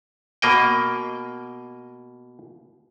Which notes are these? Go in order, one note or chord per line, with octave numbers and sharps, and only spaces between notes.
B2 A#3 D#5 G5